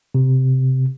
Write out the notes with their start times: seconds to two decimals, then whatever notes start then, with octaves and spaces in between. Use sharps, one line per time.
0.15 C3